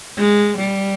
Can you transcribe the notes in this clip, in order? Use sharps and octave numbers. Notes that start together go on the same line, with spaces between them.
G#3
G3